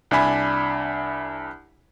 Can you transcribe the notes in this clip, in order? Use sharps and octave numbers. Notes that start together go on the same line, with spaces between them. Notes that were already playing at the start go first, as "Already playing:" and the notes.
C2 D4 E5 G#5 B5